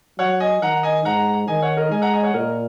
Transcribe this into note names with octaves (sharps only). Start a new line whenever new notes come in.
F#3 C#5 F#5
D#5 G#5
D#3 F#5 A#5
D#5 G#5
G#2 F#5 A#5
D#3 D#5 G#5
C#5 F#5
A#4 D#5
G#3 D#5 G#5
F#5 A#5
D#5 G#5
C#5 F#5
A#2 A#4 D#5